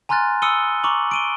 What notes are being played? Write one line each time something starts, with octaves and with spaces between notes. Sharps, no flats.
G#5 A#5 C6 F6 F#6 A6
B5 D#6 E6 C#7 D#7 G7
A#5 C#6 D6 F#7
D7 D#7 G7